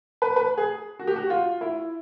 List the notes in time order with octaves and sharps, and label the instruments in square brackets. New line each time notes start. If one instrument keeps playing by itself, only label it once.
[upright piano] B4
B4
G#4
F#4
G4
F#4
F4
E4